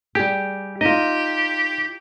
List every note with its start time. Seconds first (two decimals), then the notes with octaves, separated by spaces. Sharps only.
0.15 G3 G4 G#4
0.81 D#4 F4 G4 D#5